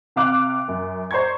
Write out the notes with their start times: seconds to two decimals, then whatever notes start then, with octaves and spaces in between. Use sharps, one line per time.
0.16 C3 F5 D6 F#6
0.68 F#2
1.11 C5 D5 A#5 C#6 G#6